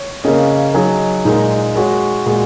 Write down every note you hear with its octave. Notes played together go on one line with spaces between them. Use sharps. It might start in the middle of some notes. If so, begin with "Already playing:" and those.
Already playing: C#5
C#3 A#3 C#4 G#4 D#5
F#3 D#4 G#4 D#5
A#2 G#3 D#4 A#4
G#3 F#4 C#5
A#2 G#3 F#4